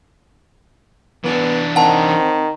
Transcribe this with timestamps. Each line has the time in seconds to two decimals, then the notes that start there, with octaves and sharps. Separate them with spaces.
1.24 E3 B3 D4
1.76 D#3 C4 F#5 A5